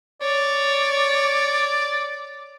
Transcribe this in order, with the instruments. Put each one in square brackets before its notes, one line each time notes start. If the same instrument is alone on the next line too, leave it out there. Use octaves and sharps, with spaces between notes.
[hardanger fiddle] C#5 [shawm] D5